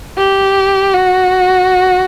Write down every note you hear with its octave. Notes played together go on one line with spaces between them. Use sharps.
G4
F#4